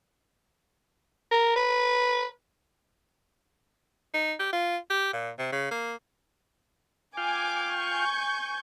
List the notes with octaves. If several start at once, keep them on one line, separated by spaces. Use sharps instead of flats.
A#4
B4
D#4
G4
F4
G4
A#2
C3
C#3
A#3
F4 F5 G5 G#5 D6
G#5 C#6 G6